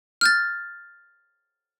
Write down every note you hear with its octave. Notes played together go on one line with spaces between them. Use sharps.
F6 G6 A6